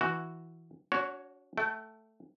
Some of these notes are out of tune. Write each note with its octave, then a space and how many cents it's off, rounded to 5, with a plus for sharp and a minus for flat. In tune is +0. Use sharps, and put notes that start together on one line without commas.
E3 +0 F#4 +0
D4 -45 F#4 +0 C#5 +0
A3 +0 G5 -45